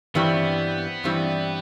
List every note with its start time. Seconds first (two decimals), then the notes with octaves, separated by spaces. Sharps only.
0.15 G2 E3 G3 B3 C4
1.04 G2 E3 G3 C4